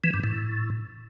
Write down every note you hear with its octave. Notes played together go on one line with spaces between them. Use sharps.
E3
G2
A2